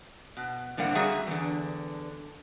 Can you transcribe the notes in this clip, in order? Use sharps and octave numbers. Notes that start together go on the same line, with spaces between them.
B2
A2 D3 G3 A#3 C4 F#5
G3 C4 F#4 G#4 E5 A#5
E2 G2 D3